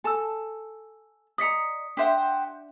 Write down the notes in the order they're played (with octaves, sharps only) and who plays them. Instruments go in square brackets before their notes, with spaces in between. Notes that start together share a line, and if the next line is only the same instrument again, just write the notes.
[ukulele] A4 A5 [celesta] G#5 E6
[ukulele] D5 D#5 A#5 [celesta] D#6 B6 C#7
[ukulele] D4 E5 [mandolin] G4 C5 F#5